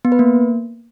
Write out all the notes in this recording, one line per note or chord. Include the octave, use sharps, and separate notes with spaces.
B3
B4
A#3